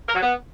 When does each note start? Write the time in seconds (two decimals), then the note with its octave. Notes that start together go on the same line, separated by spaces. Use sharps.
0.07 A#4
0.14 F#3
0.21 B3